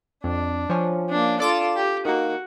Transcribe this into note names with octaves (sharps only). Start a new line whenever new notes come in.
F2 D4
F3 C#4
A#3 D4
F4 A4 D5 D6 E7
G4
D#3 A#3 F#4